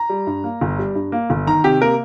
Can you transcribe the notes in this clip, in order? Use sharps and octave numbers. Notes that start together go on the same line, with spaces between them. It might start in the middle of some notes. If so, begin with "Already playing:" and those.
Already playing: A#5
G3
G2
A#3
G1
G3
G2
A#3
G1
D#3 A#5
C3 G4
A#3 A#4